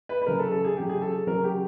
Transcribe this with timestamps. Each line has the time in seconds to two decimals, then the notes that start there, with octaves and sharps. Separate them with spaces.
0.09 B4
0.22 B4
0.26 C#3 F#3 A#4
0.39 A4
0.51 A4
0.64 G#4
0.77 C#3 F#3 G4
0.89 G#4
1.02 A4
1.27 C#3 F#3 A#4
1.44 G4